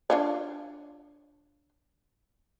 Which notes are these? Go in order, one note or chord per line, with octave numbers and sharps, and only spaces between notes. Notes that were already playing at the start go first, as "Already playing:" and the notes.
D4 F4 C#5